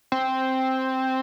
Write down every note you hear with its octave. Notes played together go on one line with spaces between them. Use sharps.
C4